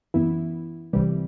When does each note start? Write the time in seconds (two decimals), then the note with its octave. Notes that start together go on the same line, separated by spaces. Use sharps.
0.14 F#2 E3 B3 E4
0.93 C2 C3 E3 G3